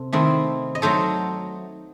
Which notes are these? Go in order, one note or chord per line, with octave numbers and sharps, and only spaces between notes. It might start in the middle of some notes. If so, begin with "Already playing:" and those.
Already playing: C3 A4
D#3 A3 C4 E4
D#5
F#3 A3 D#4 A4 C5